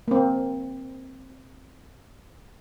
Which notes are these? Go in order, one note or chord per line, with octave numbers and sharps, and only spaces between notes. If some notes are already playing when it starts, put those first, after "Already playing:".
A#3 C4